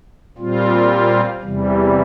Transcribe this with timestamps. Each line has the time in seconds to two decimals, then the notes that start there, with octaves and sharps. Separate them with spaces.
0.37 A#2 G3 C4 F4
1.42 E2 C3 E3 G3